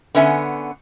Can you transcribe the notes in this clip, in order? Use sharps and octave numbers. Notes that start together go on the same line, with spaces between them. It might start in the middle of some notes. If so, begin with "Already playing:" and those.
D3 B3 C#4 E5 G#5